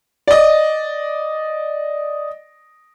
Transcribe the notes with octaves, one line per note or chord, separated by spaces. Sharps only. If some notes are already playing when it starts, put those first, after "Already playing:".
D5 D#5